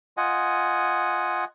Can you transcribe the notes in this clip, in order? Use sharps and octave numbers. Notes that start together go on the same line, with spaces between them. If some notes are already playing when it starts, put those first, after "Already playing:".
F4 D#5 F#5 G#5